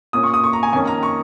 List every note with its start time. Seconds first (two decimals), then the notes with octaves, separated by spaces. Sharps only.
0.13 A#2 A#3 C#4 D#6
0.23 C#6
0.34 D#6
0.44 C#6
0.53 A#5
0.63 G#5
0.73 F2 D#3 A#3 C#4 G#5
0.87 A#5
1.03 C#6